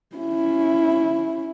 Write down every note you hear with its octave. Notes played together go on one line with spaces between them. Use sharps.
C#4 E4